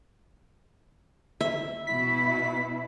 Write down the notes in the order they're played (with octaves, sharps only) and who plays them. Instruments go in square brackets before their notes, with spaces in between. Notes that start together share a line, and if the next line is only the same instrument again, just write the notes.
[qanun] E5
[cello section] B2 E4 [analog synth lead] B6